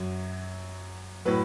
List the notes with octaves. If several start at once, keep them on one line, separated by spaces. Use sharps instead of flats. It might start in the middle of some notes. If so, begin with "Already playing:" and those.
Already playing: F#2 F#3
A2 F#3 B4